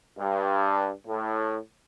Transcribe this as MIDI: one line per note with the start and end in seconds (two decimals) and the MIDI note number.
0.18 0.91 43
1.08 1.58 45